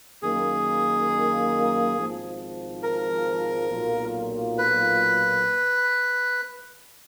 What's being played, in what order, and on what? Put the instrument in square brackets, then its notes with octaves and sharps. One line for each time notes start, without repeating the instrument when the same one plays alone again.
[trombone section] F#2 D#3 A#3 [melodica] G#4
[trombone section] G#1 G#2 F3
[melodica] A#4
[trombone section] B1 A#2 F#3 A#3 F4
[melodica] B4